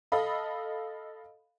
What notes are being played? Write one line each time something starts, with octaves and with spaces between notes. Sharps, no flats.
A4 D#5 F5 B5